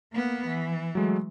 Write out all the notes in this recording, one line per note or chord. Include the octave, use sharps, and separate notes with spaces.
A#3 B3
E3
F#3 G#3 A3